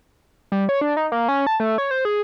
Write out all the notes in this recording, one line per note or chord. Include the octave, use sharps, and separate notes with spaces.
G3
C#5
D4
D#4
A#3
C#4
A5
A3
C#5
C5
G#4